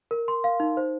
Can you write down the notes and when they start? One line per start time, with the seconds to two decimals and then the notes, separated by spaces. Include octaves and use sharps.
0.11 A#4
0.28 C6
0.44 F5
0.60 D#4
0.77 C5